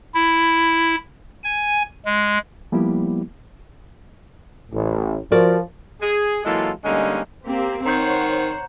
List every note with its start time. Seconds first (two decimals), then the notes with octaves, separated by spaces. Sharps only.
0.14 E4
1.44 G#5
2.06 G#3
2.72 F3 G3 A#3 B3 E4 G4
4.72 A1 A2
5.32 F3 F#4 A#4 D5
6.01 G#4
6.45 E3 F#3 G#3 A#3 F4 A4
6.84 D3 G3 G#3 A#3 C#4 D#4
7.47 A#3 C4 G4
7.86 D#3 C5 C#5 F#5 A#5 G6